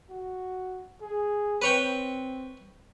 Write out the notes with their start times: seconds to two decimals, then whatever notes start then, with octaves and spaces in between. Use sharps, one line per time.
0.10 F#4
1.02 G#4
1.62 C4 B4 C#5 G5